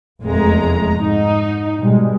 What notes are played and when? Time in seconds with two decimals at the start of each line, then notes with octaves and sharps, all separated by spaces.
0.24 F1 E2 G#3 A3 A#5
0.96 G#2 D#4
1.78 B2 G3 G#3